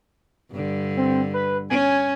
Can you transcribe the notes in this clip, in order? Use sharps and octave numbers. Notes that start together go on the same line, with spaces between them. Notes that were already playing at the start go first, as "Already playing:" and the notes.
G2 D3
C4
B4
C#4 G#5